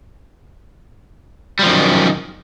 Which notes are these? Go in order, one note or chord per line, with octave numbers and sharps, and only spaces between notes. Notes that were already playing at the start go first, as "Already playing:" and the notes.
F#2 D#3 F3 G3